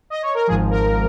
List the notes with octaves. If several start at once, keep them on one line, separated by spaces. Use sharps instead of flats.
D#5
C#5
A#4
G#1 G#2 F3 G#4
A#4